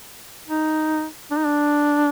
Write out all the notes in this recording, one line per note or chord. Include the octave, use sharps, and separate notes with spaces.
D#4
D4
D#4
D4